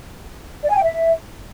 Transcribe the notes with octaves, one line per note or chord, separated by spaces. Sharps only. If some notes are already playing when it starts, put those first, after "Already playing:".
D5
G#5
G5
E5